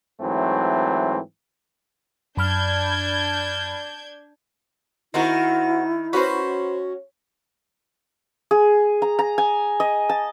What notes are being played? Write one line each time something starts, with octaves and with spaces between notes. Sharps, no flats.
G#2 E3 F#3 A3 C4
F#2 D4 B5 F6 G6 G#6
D#3 C4 E4 F#4 A#4
C#4 F#4 B4 C5
G#4
A#5
A#5
G#5
D#5
A5